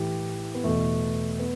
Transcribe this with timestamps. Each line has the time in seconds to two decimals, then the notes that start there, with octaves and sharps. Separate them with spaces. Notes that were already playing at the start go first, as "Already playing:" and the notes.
Already playing: A2 E3 G4
0.55 B3
0.64 E2 B2 A3
1.39 B3